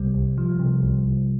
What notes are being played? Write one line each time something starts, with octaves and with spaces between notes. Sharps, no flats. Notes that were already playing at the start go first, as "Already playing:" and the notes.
Already playing: C2 C3 G3
C2
F3
C3
C2
C2